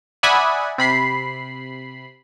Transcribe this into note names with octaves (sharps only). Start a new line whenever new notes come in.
D5 E5 F#5 G#5 B5 D#6
C3 B5 C7